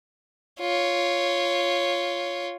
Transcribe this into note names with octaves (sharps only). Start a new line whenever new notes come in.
F4 C#5